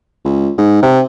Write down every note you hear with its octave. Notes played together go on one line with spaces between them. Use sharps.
C#2
G#2
C3